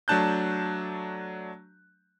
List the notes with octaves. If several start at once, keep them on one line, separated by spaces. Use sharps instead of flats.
F#3 A3 D4 A5 F#6 G6